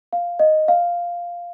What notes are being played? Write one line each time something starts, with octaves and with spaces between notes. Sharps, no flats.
F5
D#5
F5